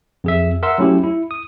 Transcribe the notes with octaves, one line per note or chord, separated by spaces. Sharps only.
F2 G#4 E5
A#4 E5 F#5 C6 E6
F#3 A3 C#4 E4 G4
E4
D#6